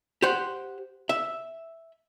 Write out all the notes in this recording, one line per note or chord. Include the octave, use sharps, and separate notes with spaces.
G4 C5 F#5
E5